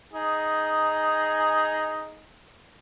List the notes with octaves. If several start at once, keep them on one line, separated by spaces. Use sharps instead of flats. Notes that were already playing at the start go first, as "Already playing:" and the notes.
D#4 G#4